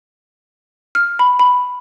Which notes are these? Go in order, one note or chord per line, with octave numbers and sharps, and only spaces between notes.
F6
B5
B5